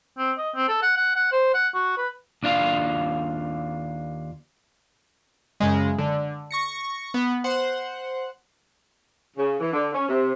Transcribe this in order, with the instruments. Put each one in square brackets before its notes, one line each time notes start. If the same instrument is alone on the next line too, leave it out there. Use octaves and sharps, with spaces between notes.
[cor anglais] C4
D#5
C4
A4
F#5
F#5
F#5
C5
F#5
F#4
B4
[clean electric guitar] D#2 D4 F4 F5
[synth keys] F#2 C#3 G#3
D3
C#6 A#6 C#7
B3
C5 F#5
[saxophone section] C#3
E3
D3
C#4
C3